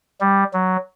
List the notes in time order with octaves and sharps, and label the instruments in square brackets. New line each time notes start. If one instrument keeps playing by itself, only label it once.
[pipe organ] G3
F#3